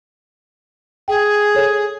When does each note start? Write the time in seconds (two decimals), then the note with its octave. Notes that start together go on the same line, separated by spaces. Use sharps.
1.08 G#4 G5
1.55 A4 C#5